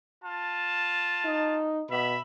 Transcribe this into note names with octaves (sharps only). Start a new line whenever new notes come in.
F4 A5
D#4
B2 E5 B5